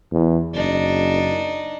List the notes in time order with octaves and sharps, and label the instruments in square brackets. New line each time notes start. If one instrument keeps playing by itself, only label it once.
[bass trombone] E2
[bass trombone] F#1 [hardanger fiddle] D4 D#4